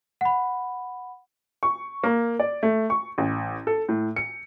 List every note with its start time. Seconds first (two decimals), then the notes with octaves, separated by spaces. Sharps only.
0.21 F#5 B5
1.63 C#6
2.04 A#3
2.40 D5
2.63 A3
2.90 C#6
3.18 A1
3.67 A4
3.89 A2
4.16 C#7